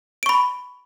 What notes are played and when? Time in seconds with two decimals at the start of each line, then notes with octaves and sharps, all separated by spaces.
0.23 D7
0.26 C#6
0.29 B5